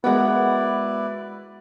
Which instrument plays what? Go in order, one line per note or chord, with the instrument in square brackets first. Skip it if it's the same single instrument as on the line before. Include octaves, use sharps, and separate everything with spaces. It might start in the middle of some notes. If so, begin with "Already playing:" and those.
[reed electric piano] G#3 B3 [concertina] E4 B4 D5 [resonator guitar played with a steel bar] F#4 A#4 F#5